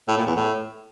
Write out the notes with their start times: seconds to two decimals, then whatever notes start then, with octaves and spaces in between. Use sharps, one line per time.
0.08 A2
0.17 A#2
0.26 E2
0.36 A2